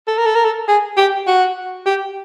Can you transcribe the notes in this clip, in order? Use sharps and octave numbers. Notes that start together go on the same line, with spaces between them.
A4
A#4
A4
A#4
A4
G#4
G4
F#4
G4